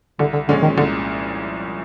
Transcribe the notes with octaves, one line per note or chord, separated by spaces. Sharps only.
C2 D3
D3
A#2 D3 F3 G#3 C#4
D#3
C2 D3